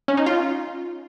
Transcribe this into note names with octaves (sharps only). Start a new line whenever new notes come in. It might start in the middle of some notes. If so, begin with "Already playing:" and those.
C#4
D#4
F4